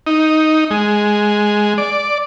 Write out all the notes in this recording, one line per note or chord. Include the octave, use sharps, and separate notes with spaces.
D#4
G#3
D5